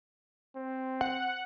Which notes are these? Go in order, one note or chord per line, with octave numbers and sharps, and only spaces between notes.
C4
F#5